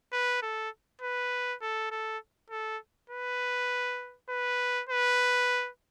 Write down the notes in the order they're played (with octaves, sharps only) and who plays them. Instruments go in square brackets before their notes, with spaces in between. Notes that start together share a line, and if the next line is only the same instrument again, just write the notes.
[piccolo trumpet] B4
A4
B4
A4
A4
A4
B4
B4
B4